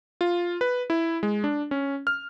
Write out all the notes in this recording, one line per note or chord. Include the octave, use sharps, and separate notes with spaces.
F4
B4
E4
G#3
D4
C#4
F6